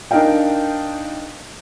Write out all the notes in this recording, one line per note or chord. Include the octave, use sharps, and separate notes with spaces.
D4 D#4 A#4 D#5 F5 G5